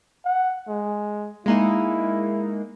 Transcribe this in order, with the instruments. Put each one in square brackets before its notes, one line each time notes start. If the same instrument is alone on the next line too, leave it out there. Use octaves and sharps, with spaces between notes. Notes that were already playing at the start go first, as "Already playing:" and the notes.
[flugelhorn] F#5
G#3
[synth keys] G#3 A#3 D#4 [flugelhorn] E4